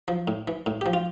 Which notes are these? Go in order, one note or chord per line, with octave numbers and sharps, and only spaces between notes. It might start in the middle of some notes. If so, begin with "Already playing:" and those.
F3
A2
E3
A2
F3 G4
F4